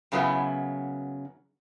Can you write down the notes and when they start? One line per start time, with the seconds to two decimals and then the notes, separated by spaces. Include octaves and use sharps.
0.12 F#2 C#3 F#3 B3 E4